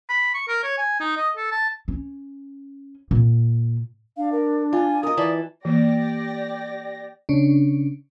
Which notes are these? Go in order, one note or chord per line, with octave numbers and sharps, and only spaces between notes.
B5
C#6
A#4
C#5
G#5
D#4
D#5
A4
A5
C#4
A#2
D4 F5
A#4
F4 G#5
A#4 D#5 D#6
E3 D5 A5 B5
E3 A#3 G4 D5 A#6
C#3 C#4 D4